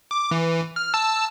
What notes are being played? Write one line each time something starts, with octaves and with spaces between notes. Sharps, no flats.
D6
E3
F6
A5 E6